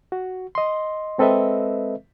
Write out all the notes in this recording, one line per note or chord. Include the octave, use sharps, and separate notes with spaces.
F#4
D#5 C6
G#3 C4 A4 B4 D#5 E5